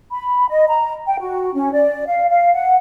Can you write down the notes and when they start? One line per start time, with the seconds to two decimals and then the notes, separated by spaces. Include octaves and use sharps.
0.12 B5
0.48 D#5
0.68 A#5
1.07 G5
1.19 F#4
1.54 C#4
1.72 D5
2.06 F5
2.29 F5
2.54 F#5